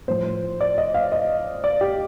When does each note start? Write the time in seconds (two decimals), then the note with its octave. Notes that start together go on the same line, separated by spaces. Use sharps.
0.08 A2 F3 C5
0.61 D5
0.78 D#5
0.94 F5
1.12 D#5
1.64 D5
1.81 G4